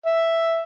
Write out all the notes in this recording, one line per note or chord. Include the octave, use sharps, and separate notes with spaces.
E5